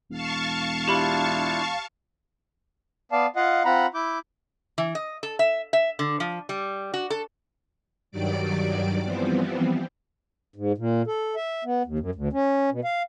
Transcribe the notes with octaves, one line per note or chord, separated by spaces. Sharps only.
E1 F5 A5 C#6
D4 E4 F4 G4 B5
B3 D5 F5 A5
F4 D#5 F5 F#5
C4 F4 F#5 A#5 B5
E4 D6 G6
E3
D#5
A4
E5
E5
D3
F3
G3
F#4
A4
G2 D#3 F#3 G3 D5 D6
E3 F3 G3 B3 C4
G#2
A#2
A4
E5
B3
D#2
F#2
D2
C#4
B2
F5